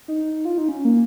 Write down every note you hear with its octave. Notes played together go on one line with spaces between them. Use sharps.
D#4
F4
D#4
C#4
A#3